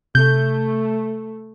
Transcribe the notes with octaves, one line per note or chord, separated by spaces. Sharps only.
C3 A3 G6